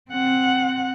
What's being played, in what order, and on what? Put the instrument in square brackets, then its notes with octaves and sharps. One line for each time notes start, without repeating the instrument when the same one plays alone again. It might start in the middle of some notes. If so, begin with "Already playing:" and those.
[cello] C4 F#5